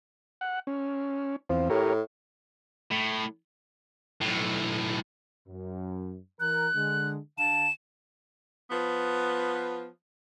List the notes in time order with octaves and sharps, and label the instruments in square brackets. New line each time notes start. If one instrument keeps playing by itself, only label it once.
[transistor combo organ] F#5
C#4
[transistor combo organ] E2 C4 [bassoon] F3
[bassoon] A2 [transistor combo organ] G4 A#4 C#5
[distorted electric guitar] A2
B1 A2
[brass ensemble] F#2
[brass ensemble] E3 A#4 [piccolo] F#6
[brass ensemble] D3 G#3
[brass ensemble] D3 F5 A5 [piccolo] E7
[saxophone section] F3 B3